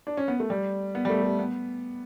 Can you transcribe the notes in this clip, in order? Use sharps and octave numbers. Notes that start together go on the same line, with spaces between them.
D4
C#4
B3
A3
G3
B3
G3
A3
A3
B3